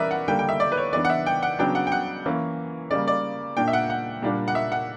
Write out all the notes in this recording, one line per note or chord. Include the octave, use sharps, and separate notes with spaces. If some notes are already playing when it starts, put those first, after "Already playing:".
Already playing: E3 G3 C#4 A#4 B4 D5 E5
F#5
D3 G3 A#3 D4 G5
G5
E5
D5
B4
C#5
E3 B3 D4 D5
F#5
E5
G5
F#5
C#3 F#3 B3 D4 G5
F#5
G5
F#5
E3 A#3 C#4
C#3 G3 A#3 D5
D5
A#2 A#3 D4 G5
E5
F#5
F#5
A#2 G3 A#3 D4
F#5
E5
F#5